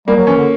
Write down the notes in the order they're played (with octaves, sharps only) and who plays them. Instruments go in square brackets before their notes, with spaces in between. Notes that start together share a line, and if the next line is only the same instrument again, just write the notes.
[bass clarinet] G3 [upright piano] A#3
[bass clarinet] F#3
[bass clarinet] E3 [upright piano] C#4
[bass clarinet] D3